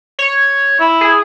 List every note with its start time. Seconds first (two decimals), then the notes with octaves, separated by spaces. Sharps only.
0.19 C#5
0.80 E4
1.01 G#4